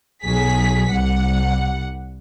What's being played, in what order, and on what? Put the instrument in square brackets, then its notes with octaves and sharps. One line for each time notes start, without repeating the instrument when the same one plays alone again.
[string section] B1 F#3 G#4 B6
C2 G3 F#5